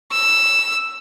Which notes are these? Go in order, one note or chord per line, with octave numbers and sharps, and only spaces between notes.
E6